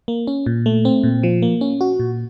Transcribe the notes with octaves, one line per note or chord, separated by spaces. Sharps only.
A#3
C#4
A#2
A3
C4
A#2
F3
A#3
C#4
F#4
A#2